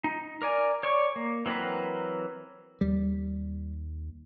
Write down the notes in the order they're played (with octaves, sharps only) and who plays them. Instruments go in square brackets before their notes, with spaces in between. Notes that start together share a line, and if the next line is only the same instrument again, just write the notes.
[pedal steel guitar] D#4
A#4 D5 G#5
C#5 D5 C#6
A#3
E3 F#3 C4 A#4 B4
[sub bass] D#2 [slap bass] G3